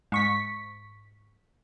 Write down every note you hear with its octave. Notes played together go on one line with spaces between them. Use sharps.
G#2 C#6 B6